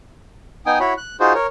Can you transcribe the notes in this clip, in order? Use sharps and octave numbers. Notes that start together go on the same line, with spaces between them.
B3 D#4 G5 G#5 D#6
E4 F#4 C#5 B5
F#6
D#4 F4 F#4 G#4 C5
A#4 C#5